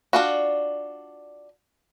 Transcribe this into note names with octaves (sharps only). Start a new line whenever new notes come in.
D4 F4 F#4